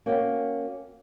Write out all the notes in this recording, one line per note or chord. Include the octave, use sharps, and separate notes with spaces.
A#3 C#4 F#4 G5